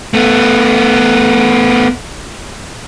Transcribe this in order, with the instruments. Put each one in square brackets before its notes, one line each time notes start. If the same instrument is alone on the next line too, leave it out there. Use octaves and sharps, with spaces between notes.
[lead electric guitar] A3 B3